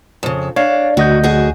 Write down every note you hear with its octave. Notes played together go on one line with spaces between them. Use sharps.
F2 C#3
D4 C#5 F5
D2 F#4 D#5 G6
F#3 F#4 G#4